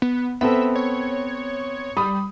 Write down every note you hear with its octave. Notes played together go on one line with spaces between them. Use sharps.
B3
B3 C4 A4 E5
C#5
G3 B5 D#6